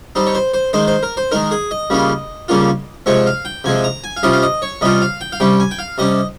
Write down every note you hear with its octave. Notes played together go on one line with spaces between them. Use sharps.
G3 C4 D#4
C#5
C5
C5
D#3 G#3 D#4 C5
C5
A#4
C5
D#3 G#3 D#4 A#4
G#4
D#5
C#3 G3 A#3 C#4 F4
C#3 G3 A#3 C#4 F4
C3 F3 G#3 C4 C#5
F5
G5
C3 F3 G#3 C4 G#5
A#5
G#5
F5
C3 G3 C#4 F4 D#5
F5
D#5
C#5
C3 G3 C#4 F4 D#5
F5
G5
F5
C3 G3 C#4 G5
G#5
G5
F5
C3 G3 C#4 D#5